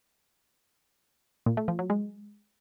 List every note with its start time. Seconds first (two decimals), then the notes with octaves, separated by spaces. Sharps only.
1.46 A#2
1.57 A3
1.68 F3
1.79 F#3
1.90 G#3